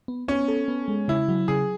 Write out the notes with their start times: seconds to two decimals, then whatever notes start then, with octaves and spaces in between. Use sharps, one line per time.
0.08 B3
0.28 B3 C#4
0.48 A4
0.68 B3
0.88 G#3
1.08 C#3 E4
1.29 F#3
1.48 C#3 G#4